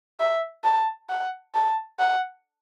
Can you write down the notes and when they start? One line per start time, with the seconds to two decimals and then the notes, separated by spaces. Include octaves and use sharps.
0.20 E5
0.64 A5
1.10 F#5
1.55 A5
2.00 F#5